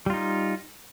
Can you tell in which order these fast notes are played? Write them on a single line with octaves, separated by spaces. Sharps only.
G3 F4 D#4